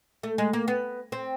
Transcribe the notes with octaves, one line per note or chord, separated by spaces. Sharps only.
A3
G#3
A#3
B3
C4